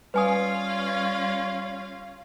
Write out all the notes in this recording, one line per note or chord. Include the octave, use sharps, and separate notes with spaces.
G3 C#4 F4 B4 F5 G#5 D#6